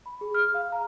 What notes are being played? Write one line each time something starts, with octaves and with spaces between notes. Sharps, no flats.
B5
G#4
F6
F5
A#5